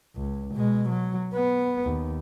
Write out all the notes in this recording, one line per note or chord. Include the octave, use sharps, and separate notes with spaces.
C#2
B2 G#3
F#3
B3
D#2